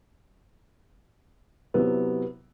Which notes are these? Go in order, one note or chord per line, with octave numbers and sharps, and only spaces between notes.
C3 F#3 B3 E4